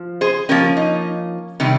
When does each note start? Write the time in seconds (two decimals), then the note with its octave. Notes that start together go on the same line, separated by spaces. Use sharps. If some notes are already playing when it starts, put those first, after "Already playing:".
Already playing: F3
0.21 G#4 C5
0.49 F3 A#3 C#4 G4 A#4
0.77 D#4
1.60 C3 D#3 G3